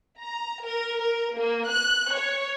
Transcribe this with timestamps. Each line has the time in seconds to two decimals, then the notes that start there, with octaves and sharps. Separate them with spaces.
0.19 A#5
0.62 A#4
0.97 A#4
1.35 A#3
1.68 F#6
2.12 C#5